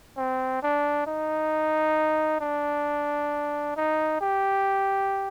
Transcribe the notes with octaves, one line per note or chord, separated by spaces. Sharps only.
C4
D4
D#4
D4
D#4
G4